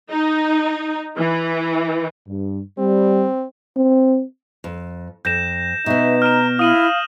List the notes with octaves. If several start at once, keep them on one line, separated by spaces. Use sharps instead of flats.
D#4
E3
G2
G3 C4
C4
F2
F2 G6 A#6 E7
B2 B3 D#4 E5
A#5 F6 E7
E4 F5 D#6 D#7 F#7